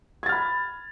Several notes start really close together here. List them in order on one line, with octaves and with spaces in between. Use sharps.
G#6 A6 F6 B5